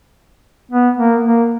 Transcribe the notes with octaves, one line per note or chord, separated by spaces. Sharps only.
B3
A#3
A#3